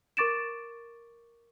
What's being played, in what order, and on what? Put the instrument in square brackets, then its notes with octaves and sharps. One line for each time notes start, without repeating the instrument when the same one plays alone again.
[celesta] A#4 C#6 D6 A6 D7 E7